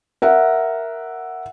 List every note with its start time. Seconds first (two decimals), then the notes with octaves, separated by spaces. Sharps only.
0.22 A#4 E5 F#5